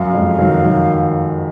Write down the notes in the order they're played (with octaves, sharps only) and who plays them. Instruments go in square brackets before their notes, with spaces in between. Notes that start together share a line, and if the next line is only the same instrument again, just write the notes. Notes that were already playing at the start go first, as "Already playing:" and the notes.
Already playing: [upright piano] F#2 [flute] F5
[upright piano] F2 G#2
D#3 F#3
D#3 F#3